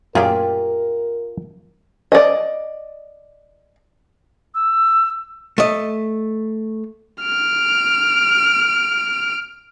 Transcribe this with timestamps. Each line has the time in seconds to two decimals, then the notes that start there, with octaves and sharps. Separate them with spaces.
0.15 F#2 A#2 F4 G4 G#4 A#4
2.12 D5 D#5
4.55 E6
5.58 A3 D#5
7.23 F6 D7